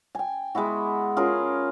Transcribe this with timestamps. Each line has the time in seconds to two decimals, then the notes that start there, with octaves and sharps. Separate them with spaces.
0.15 G5 G#5
0.55 G#3 B3 E4 F#4
1.17 C#4 F4 G#4 A#4